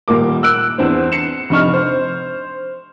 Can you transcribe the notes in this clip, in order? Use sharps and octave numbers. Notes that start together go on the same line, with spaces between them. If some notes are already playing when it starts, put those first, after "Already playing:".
D#1 A#2 A#3 D6
E6 F#6 D7
E2 C4 D4 C5
C7 C#7 E7
F1 C3 D4 D#4 C#6 F6
C5